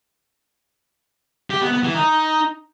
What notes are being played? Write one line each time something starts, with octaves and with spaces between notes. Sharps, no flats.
G4
B3
B3
E3
D#4